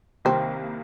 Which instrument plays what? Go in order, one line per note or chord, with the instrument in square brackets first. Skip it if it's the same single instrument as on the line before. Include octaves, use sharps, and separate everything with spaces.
[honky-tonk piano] C2 C3 D#3 G3 A#3 [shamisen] C4